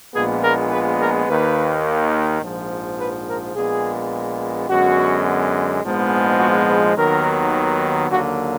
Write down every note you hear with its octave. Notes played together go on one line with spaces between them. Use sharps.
A#1 A#2 G#3 B3 G#4
A#4
B4
A#4
D#2 D#3 A#3 B4
A#1 G#2 F3
B4
A#4
A#1 A#2 G#3 B3 G#4
F#2 D3 G#3 B3 F#4
A#1 G#2 F3 G#3 B3
F#4
B4
D#2 D#3 F#3 B3 A#4
D#2 D3 F#3 A#3 F#4